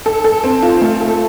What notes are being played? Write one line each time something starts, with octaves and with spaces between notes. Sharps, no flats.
A4
A4
C4
F4
A3
A4